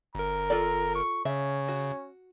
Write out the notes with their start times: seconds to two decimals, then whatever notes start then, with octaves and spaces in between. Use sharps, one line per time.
0.15 G1 A#4 A#5
0.50 F4 A4 D5
0.95 C#6
1.25 C#3 C#4 E5
1.68 F#4